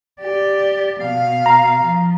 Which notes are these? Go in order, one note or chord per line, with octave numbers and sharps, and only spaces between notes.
G4 D5
B2 F5
A#5
F3